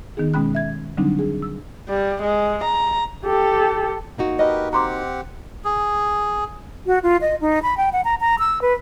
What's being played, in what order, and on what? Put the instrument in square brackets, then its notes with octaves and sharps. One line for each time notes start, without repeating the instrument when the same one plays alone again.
[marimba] D#3 B3 D#4 G#4
B2 G#3 C#4 G5 B5 F#6
E5 G#6
D3 F#3 G3 C4 D4 D#4
G#4
E6
[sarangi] G3
G#3
A#5
[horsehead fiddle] G4 A4
[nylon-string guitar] A#3 D#4 F#4
[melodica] G4 A#4 B4 [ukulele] D#5
[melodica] C4 G4 F#5 [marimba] A#5 C6 D6
[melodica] G#4
[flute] F#4
F4
D#5
D#4
B5
G5
F#5
A#5
A#5
E6
B4